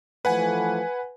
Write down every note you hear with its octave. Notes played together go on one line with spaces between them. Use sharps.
E3 F3 A3 B4 F#5 G#5